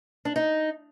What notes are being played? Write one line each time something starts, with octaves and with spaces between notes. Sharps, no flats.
D4
D#4